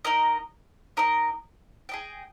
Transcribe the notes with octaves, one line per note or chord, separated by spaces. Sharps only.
D#4 A#4 D#5
D#4 A#4 D#5
G#4 D#5 G5